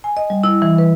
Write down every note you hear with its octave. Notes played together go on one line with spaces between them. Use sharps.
G#5
D#5
G3
E4
E3
B4